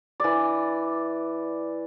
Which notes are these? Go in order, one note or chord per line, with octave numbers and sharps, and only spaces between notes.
E3 D5